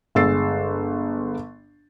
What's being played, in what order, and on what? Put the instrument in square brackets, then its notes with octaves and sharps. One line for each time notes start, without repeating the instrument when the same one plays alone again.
[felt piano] G1 G#3 E6 A6 C7